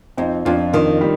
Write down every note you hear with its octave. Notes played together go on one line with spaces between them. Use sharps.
F2 C4 D#4
F2 D4 F4
D#3 D4 F4
G3